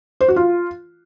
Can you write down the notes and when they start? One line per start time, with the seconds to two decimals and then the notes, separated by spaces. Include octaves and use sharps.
0.21 C5
0.28 F#4
0.36 F4